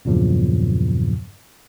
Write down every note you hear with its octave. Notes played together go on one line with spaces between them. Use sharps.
E2 G2 A#2 C#3 F3 F#3